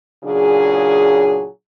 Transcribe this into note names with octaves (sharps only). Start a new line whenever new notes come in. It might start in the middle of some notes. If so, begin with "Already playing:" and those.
A#2 C#3 F#3 D4 G#4